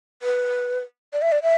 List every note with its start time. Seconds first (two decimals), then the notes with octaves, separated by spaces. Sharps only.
0.22 B4
1.13 D5
1.22 E5
1.32 D5
1.43 E5